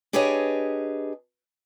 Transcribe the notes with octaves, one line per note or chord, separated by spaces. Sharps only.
D4 G4 G#4 B4 C#5 D#5